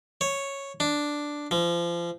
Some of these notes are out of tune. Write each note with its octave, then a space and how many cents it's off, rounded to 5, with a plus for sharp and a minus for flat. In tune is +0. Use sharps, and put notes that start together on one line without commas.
C#5 -5
D4 +0
F3 -30